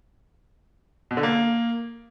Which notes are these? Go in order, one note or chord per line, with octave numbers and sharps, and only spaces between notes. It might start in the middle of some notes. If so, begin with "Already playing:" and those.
B2
D3
A#3